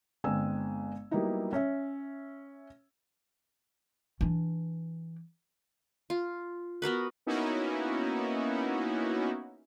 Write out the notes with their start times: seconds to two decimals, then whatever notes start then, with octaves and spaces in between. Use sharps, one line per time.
0.24 G1 G#3 C4 G#5 E6
1.11 F#3 G3 A#3 B3 D#4 E4
1.53 C#4 C#5 E5
4.21 E3 D4
6.10 F4
6.82 B3 F#4 A#4 B4
7.26 A#3 B3 C#4 D#4 E4 F#4